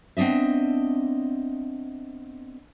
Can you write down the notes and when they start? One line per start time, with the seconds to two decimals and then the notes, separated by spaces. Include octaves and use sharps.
0.17 B3 C4 D4 D#5 E5